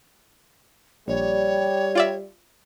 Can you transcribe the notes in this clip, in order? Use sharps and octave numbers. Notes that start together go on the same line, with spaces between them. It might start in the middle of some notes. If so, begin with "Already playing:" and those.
A#1 G3 C#5
F4 D5 E5